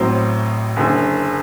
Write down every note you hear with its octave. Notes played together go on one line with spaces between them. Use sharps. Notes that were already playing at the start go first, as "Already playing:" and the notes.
Already playing: A1 A2 F#3 C4
F#1 F#2 D3